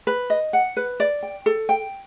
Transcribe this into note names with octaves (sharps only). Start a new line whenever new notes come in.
B4
D#5
F#5
B4
D5
G5
A4
G5